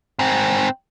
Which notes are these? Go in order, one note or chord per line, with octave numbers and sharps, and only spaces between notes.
G#2 C4